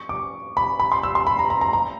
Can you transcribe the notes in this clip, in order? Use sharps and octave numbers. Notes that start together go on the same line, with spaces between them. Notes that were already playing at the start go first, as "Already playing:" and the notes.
Already playing: C#6
D6
B5
B5
C6
E6
C6
B5
A#5
A#5
A#5
A#5